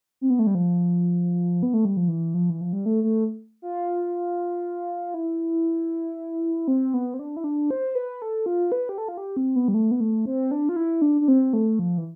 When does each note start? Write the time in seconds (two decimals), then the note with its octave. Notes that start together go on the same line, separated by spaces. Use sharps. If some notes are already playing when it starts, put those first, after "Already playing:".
0.21 C4
0.30 B3
0.39 A3
0.47 G3
0.55 F3
1.63 B3
1.74 A3
1.85 G3
1.97 F3
2.08 E3
2.34 F3
2.50 E3
2.61 F3
2.73 G3
2.86 A3
3.04 A3
3.62 F4
5.14 E4
6.68 C4
6.94 B3
7.14 C4
7.19 D4
7.37 E4
7.44 D4
7.70 C5
7.95 B4
8.22 A4
8.46 F4
8.72 B4
8.89 G4
8.98 A4
9.08 F4
9.18 G4
9.37 C4
9.56 B3
9.68 G3
9.74 A3
9.91 B3
10.00 A3
10.25 C4
10.51 D4
10.69 F4
10.76 E4
11.02 D4
11.21 D4
11.28 C4
11.53 A3
11.79 F3
11.98 E3